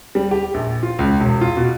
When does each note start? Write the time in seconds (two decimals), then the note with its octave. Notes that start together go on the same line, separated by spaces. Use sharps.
0.15 G3
0.31 G4
0.54 A#1
0.83 F4
0.99 C#2
1.21 E1
1.41 F4
1.57 B2